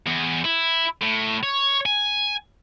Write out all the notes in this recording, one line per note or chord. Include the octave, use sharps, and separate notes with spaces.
E2
E4
A2
C#5
G#5